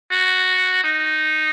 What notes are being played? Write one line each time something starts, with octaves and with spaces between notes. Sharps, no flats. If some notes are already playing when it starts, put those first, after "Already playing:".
F#4
D#4